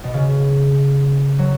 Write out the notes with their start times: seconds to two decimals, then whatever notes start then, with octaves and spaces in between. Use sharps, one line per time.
0.04 B2
0.14 C#3
1.39 F#3